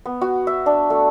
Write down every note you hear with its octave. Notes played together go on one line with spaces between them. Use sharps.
B3
F#4
E5
D4
A3